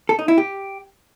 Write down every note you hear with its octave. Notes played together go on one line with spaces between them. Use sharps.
A4
D#4
E4
G4